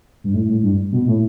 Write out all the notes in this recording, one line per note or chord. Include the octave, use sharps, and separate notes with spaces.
G2
A2
A2
G2
B2
A2